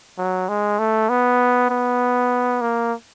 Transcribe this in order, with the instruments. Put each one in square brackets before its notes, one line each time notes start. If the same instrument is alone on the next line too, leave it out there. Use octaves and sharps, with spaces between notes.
[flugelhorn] F#3
G#3
A3
B3
B3
A#3